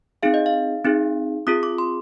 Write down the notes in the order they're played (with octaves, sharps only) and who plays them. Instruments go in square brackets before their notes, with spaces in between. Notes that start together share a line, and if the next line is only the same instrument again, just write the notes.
[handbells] C4 D#4 G#4 F5
D#5
F5
C4 D#4 G#4
C4 F4 G#4 D#6
D6
C6